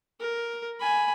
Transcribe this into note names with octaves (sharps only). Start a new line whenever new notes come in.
A#4
G#5 B5